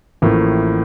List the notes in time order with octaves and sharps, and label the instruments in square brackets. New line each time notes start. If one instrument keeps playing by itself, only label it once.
[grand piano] A1 A2 F3 A#3